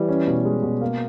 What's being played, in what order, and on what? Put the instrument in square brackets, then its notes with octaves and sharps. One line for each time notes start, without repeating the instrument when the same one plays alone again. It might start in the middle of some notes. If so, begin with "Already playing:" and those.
Already playing: [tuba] E3 [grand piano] G3
[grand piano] C#4
B2
G#3
B2
A#3